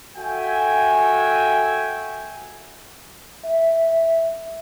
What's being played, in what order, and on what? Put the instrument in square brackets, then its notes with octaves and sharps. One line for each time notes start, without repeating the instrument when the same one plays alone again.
[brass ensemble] F#4 A4 E5 G5 G#5
[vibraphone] E5